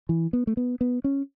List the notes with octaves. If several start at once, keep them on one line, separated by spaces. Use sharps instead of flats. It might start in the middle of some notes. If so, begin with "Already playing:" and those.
E3
B3
A3
B3
B3
C#4